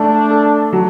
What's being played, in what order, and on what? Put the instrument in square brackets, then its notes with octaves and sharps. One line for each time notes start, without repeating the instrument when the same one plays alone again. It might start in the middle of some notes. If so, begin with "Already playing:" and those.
Already playing: [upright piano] A3 [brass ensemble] D4
[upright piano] A4
F#3